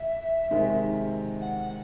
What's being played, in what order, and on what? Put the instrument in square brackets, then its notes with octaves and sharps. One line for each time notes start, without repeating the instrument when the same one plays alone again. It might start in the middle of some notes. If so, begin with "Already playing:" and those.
Already playing: [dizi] E5
[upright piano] C3 D#3 G#3
[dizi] F#5